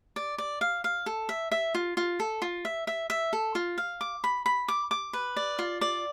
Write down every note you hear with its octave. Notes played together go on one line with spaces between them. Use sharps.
D5
D5
F5
F5
A4
E5
E5
F4
F4
A4
F4
E5
E5
E5
A4
F4
F5
D6
B5
B5
D6
D6
B4
D5
F4
D5